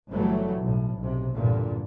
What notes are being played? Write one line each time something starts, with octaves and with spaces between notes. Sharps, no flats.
G1 E3 F#3 G3 A3
B1 A2
B1 C3
E2 G2 A#2 D3